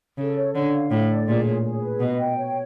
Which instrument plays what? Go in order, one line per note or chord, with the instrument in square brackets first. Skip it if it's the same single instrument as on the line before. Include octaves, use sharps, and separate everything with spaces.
[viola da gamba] C#3 [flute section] A4
[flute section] C#5
[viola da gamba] D3 [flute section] C#5
[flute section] F5
[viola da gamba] A2 [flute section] A4
[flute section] D5
[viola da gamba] A#2 [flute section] G#4
[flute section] C#5
G#4
B4
[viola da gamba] B2 [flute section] D#5
[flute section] G5
C#5